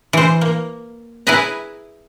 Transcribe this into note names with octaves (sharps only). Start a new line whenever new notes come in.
E3 C5
A#3
E4 G#4 B4 E5 G#5 A#5